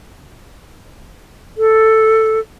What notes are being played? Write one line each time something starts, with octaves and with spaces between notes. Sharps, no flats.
A4